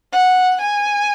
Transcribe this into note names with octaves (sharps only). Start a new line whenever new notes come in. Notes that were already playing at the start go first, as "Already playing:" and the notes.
F#5
G#5